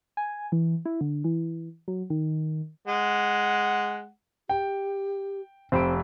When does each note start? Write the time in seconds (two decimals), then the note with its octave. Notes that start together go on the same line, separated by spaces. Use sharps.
0.17 G#5
0.52 E3
0.86 E4
1.01 D3
1.24 E3
1.88 F#3
2.10 D#3
2.88 G#3 F#5
4.49 G4 G5
5.72 F1 C4 C5 B5 D7